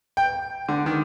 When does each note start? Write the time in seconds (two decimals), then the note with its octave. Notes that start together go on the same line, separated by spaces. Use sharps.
0.17 G5
0.69 D3
0.86 D#3